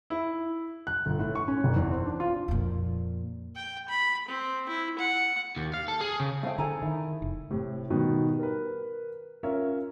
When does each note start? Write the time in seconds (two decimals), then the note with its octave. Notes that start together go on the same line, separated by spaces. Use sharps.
0.10 E4
0.87 F#6
1.06 G1
1.19 A2
1.35 C#6
1.48 C#4
1.64 F#1
1.76 E2
1.91 C4
2.06 D4
2.20 F4
2.48 F2 A#2
3.55 G5
3.89 B5
4.28 C4
4.69 E4
4.99 F#5
5.57 D#2
5.74 F5
5.88 A4
6.01 G#4
6.20 C#3
6.43 A3 C4 F5 G5
6.58 D3 G#4 A4 G#5 A#5
6.82 D#3 E4
7.22 F1
7.51 A2 C3
7.90 B2 D#3 G3 B3
8.39 A#4 B4
9.43 C#4 F4 A#4 C#5 E5